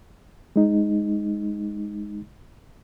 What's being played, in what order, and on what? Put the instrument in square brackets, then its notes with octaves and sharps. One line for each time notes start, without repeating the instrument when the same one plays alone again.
[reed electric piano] G#3 D#4